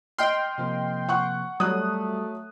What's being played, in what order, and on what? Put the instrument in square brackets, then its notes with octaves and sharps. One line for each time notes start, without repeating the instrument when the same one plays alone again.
[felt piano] D#5 F6 [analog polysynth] G5 C6
[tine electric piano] C3 F3 A#3
[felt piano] F#5 C#6 F#6
[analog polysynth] F#3 [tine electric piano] G3 [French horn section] A3 [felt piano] D#6 F#6